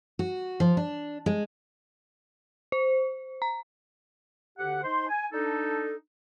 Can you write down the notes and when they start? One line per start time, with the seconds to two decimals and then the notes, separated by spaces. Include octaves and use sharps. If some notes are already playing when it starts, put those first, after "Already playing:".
0.19 F#4
0.60 F3
0.77 D4
1.26 G#3
2.72 C5
3.42 A#5
4.58 D2 D3 G4 F#5
4.83 D#4 C5 C6
5.09 G#5
5.33 D4 D#4 A4